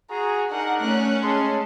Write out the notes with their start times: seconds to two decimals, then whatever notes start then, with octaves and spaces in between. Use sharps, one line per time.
0.10 F#4 G#4 A#5
0.51 D4 D#4 A#4 F#5
0.80 A3 C#4 F#6
1.23 G#3 G#4 A5 C6